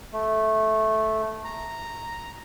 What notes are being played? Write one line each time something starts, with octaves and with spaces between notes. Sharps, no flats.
A3
A#5